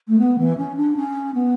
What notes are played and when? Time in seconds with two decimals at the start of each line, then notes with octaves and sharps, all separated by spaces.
0.08 A3
0.19 B3
0.38 E3
0.57 C#4
0.77 D4
0.96 C#4
1.34 B3